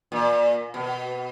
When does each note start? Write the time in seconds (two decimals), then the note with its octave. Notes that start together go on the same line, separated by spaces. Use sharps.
0.12 A#2
0.74 B2